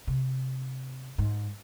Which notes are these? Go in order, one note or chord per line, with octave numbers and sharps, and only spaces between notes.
C3
G#2